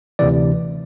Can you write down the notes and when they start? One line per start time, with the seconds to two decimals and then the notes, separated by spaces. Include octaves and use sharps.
0.19 D2 C3 E3 D5